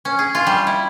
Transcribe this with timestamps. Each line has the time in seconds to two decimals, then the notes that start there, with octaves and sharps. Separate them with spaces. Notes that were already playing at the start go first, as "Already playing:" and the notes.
0.05 C#4
0.19 G#4
0.35 F4
0.47 G3
0.67 E4